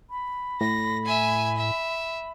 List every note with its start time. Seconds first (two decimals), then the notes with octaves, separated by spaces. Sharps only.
0.10 B5
0.61 A2 A#6
1.05 E5 G#5
1.57 E5